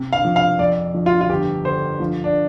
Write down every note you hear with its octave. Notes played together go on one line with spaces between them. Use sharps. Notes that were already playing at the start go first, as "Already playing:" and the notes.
Already playing: C3
F5
F3
F5
F2 D5
F3
F4
F4
G1 G4
D3 C5
F3
D4